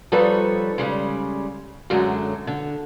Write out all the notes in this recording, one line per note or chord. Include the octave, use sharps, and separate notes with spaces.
F3 G3 D#4 A4 B4 C#5
C#3 G3 G#3
F#2 D3 F#3 G#3 A3
D3